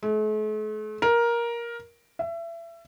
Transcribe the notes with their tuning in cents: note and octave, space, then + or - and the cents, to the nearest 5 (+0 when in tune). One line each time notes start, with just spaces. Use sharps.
A3 -45
A#4 +10
E5 +30